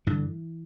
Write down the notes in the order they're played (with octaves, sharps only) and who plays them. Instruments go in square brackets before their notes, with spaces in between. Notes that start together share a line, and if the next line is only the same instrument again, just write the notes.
[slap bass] G2 D3 E3